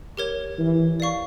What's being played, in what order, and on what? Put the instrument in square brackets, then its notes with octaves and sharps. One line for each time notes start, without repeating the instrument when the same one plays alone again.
[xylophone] G4 A#4 C#5
[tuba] E3
[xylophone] D5 F5 C#6